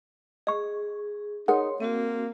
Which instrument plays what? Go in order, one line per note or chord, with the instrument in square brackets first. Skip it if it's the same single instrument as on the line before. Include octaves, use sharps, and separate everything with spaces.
[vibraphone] G#4 [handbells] D#5 C#6
[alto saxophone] D#4 [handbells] G#4 A#4 F#5 [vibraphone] C#5 C6
[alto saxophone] A#3 [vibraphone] C4 F#4